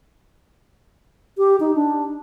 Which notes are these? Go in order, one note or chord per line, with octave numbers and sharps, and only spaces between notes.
G4
D#4
D4